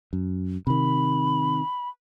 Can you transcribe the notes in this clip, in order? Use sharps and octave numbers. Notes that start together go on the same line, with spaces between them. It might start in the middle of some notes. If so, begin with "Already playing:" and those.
F#2
C3 D#3 B5